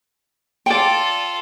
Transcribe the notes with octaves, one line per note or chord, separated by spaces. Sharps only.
F4 A4 D5 G5